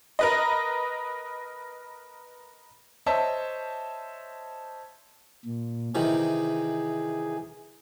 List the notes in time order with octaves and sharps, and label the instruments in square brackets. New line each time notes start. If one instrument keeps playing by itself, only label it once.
[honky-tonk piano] A#4 B4 D#5
[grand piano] C5 C#5 D#5 E5 A5 E6
[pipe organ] A#2
[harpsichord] C3 D#3 E3 [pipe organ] G#4